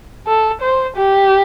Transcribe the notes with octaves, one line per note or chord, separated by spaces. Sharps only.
A4
C5
G4